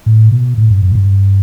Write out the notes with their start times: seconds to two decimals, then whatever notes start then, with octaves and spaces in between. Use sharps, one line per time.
0.06 A2
0.31 B2
0.58 A2
0.70 G2
0.82 F#2
0.91 A2
0.95 G2